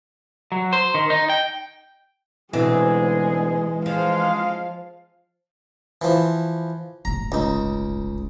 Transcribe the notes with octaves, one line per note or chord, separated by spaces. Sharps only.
F#3
C5
D#3
D#4
G5
D2 G#2 B2 E3 G#3 C4 G#4
F3 G#3 F5
E3 F3
D1 G1 A#5
C#2 D#4